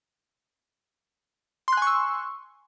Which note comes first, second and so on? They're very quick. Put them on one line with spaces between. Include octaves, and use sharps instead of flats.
C6 F#6 G#5 C#6 E6